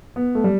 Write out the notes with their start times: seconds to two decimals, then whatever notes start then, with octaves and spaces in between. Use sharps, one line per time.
0.16 B3
0.35 A3
0.44 G3